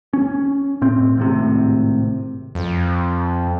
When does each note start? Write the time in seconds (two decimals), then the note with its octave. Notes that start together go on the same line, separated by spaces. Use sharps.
0.13 C#4
0.82 A2 C4
1.17 G#1 A2 C3
2.55 F2